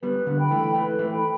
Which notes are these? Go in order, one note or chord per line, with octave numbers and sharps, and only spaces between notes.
G3 B3 B4
D3 G3
G5 B5
E3 A3
E3 A3 B4
E3 A3
G5 B5